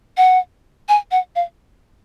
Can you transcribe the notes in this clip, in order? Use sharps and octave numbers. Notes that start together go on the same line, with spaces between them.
F#5
G#5
F#5
F5